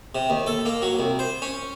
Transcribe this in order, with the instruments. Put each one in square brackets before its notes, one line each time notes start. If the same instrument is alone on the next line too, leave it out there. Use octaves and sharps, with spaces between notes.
[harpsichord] C3
D#2
A4
A#3
F#3
C2
C5
C#4